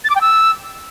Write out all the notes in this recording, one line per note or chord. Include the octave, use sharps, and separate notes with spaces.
A6
D6
G5
E6